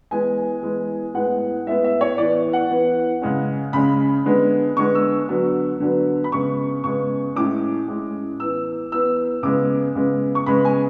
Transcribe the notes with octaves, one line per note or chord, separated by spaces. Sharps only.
E3 G#3 B3 G#5
E3 G#3 B3
A2 G#3 B3 F#5
A2 G#3 B3 E5
E5
C#5
E3 B3 D5
F#5
E3 B3
C#3 G#3 C#4
C#3 G#3 C#4 B5
D3 G#3 B3
D3 G#3 B3 C#6
E6
D3 F#3 B3
D3 F#3 B3
B5
C#3 G#3 B3 C#6
C#3 G#3 B3 C#6
A2 G#3 C#4 D6
A2 G#3 C#4
E3 B3 E6
E3 B3 E6
C#3 G#3 B3 D6
C#3 G#3 B3
C#6
C#3 G#3 B3 B5
G#5